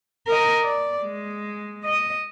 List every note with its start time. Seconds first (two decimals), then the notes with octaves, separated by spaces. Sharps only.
0.27 A#4 D#5
0.63 D5
1.02 G#3
1.84 D#5